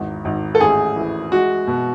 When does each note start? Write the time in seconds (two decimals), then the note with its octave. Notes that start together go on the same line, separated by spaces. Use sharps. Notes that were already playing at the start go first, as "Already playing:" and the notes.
Already playing: G#1 E2
0.25 G#1
0.55 A4
0.60 A1 G#4
0.96 E3
1.32 G#3 F#4
1.67 B2